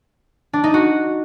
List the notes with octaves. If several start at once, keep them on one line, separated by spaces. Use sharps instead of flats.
D4
D#4
F#4